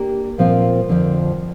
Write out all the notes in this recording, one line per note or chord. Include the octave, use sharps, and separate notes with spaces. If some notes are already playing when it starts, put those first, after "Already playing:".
Already playing: A#3 D4 G4 A#4
A#2 F3 C4 A#4 F5
F2 D3 F3